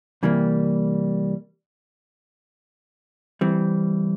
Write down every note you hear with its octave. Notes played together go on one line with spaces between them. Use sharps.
C3 E3 G3 A#3
E3 G3 C4